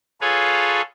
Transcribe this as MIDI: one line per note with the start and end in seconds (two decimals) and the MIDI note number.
0.21 0.81 65
0.21 0.81 68
0.21 0.81 69
0.21 0.81 71
0.21 0.81 73
0.21 0.81 77